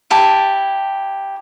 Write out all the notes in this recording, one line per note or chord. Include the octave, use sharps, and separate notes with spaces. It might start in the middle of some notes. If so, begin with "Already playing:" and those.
E4 G4 A5